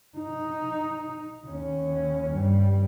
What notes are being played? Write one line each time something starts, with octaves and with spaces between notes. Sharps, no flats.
D#4
D#2 C#4
G2 G3